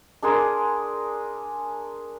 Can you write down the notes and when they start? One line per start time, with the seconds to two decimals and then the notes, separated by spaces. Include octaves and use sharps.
0.22 D4 G#4 A#4 C6